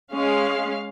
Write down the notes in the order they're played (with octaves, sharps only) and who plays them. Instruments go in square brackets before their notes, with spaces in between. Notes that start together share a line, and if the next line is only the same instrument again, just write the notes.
[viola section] G#3 C#4 F5